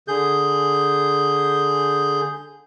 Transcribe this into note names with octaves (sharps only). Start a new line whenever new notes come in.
D3 G#4 G6